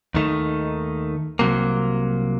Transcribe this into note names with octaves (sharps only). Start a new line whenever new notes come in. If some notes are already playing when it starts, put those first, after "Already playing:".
D#2 D#3 A3 D#4
C2 C3 F#3 A#3